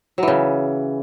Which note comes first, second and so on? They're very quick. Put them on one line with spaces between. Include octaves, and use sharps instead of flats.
F#3 E3 C#3